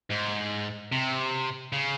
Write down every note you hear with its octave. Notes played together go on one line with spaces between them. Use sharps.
G#2
C3
C#3